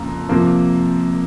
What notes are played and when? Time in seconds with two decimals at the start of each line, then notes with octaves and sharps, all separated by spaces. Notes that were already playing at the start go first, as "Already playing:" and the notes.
Already playing: F2 C#3 A#3 A#5
0.29 C3 F3 A#3